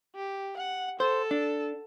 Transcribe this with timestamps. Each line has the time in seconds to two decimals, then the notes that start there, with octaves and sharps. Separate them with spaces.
0.16 G4
0.57 F#5
1.00 A4 C5
1.31 D4